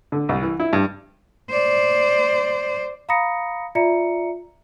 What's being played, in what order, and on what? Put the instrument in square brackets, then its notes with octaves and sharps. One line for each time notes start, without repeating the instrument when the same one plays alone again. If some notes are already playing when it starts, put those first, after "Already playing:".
[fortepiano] D3
C2
E3
E4
G2
[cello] C5 D5
[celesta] F5 A#5 B5 D#6 A#6 C#7
F4 D5 E5 A#5 C#7